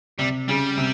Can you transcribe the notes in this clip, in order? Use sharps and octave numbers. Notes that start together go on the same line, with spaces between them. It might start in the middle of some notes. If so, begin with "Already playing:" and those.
C3 G3
C#3 G3
C3